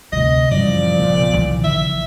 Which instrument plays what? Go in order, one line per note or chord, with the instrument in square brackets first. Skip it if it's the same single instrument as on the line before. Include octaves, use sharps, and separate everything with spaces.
[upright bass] D2 C3 [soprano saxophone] D#5
[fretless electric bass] F#2 C#3 E3 [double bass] A#2 F3 [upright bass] G3 [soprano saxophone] D5
[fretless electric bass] A#1 C#3 B3
[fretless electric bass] C2 E3 [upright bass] D#3
[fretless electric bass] A#1 C#3 E3 [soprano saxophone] E5